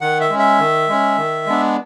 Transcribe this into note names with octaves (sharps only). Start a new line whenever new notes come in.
D#3 F#5
E5
G#3 C#4
E5
D#3
G#3 C#4
D#3
G#3 B3 D4